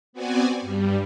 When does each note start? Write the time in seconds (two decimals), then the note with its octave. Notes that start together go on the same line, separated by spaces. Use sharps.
0.13 B3 C4 F#4 D5 G#5
0.61 G2 G3